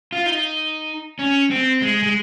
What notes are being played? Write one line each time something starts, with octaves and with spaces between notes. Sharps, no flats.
F4
D#4
C#4
C4
G#3
G#3